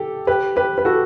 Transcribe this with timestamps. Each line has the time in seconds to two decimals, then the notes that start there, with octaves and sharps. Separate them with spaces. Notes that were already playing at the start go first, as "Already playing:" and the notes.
Already playing: G4 A4
0.27 G4 B4
0.56 G4 B4
0.78 B4
0.85 F#4 A4